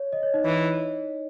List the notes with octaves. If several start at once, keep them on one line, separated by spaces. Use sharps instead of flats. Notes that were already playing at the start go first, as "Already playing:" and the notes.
Already playing: C#5
D#5
C#5
D#4 D#5
E3